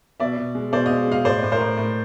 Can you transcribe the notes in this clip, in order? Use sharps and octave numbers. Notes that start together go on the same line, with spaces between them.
B2 D5 E5
B2
G#3
B2 C5 D5
G#3 D#5 F5
G#3 D#5 F5
A2 C5 D5
A2
A#4 C5
A2
A2